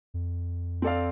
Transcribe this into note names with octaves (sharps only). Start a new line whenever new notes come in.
F2
C4 A4 D5 F5